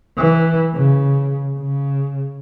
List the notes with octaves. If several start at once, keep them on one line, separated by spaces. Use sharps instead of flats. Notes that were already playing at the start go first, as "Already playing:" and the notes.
E3
C#3
C#3